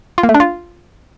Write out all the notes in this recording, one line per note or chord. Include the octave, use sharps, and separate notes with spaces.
F4
A#3
A3
D4
F4